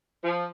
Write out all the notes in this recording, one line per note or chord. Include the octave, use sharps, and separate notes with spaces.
F3